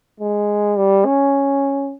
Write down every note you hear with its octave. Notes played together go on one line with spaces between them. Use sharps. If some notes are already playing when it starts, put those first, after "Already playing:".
G#3
G3
C#4